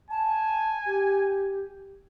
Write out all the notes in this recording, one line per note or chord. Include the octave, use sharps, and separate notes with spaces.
G#5 A5
G4